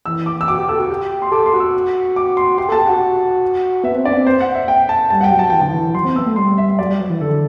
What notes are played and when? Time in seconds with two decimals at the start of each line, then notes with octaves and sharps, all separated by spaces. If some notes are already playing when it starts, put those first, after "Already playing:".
0.06 E3 E6
0.26 D6
0.41 E6
0.48 F#4 D6
0.58 G4
0.69 A4 E6
0.79 F#4
0.90 G4
1.22 C6
1.31 A4 D6
1.46 C6
1.54 F#4
1.60 E6
2.16 D6
2.37 C6
2.58 G4 C6
2.69 A4 A5
2.79 G4
2.87 F#4 F#5
3.84 B3 E5
3.95 C4
4.05 D4 D5
4.11 B3
4.15 C4
4.27 C5
4.41 F#5
4.55 E5
4.68 G5
4.89 A5
5.10 G3 A5
5.21 F#5
5.24 G5
5.31 F#3
5.39 A5
5.50 E3 G5
5.61 D3 A5
5.70 E3
5.95 F#3 C6
6.05 C4
6.15 B3 E6
6.26 A3
6.36 G3 C6
6.58 E5
6.79 F#3 D5
6.90 G3
7.00 F#3
7.10 E3
7.21 D3 A4